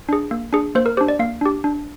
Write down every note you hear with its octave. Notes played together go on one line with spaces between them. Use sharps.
D4 G#4
A#3
D4 G#4
A#3 C5
A#4
D4 G4 C5
D5
A#3 F5
D4 G4
D4